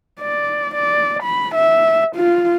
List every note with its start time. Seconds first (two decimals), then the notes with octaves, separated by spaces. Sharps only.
0.20 D5
0.75 D5
1.23 B5
1.55 E5
2.16 F4